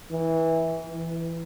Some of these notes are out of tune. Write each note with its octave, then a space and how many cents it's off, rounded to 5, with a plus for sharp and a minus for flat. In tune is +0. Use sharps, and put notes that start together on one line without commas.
E3 -15
E3 +15